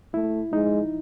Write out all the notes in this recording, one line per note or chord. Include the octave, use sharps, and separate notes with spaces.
A3 E4
G#3 D#4